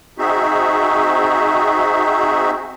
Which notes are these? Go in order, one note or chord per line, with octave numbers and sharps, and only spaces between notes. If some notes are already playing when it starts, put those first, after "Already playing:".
C4 D#4 F#4 G#4 E5